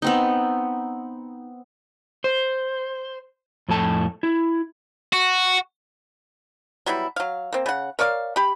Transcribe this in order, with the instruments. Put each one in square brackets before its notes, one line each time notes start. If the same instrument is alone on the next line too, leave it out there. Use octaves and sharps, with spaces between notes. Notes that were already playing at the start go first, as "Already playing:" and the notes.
[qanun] B3 C4 D#4
[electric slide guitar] C5
F2 A2 A4 A5
E4
[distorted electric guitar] F#4
[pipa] F#3 G3 B3 E4
F#3 F5
A#3 C4
C#3 F#5
A#4 C#5 D5 F5
G4 B5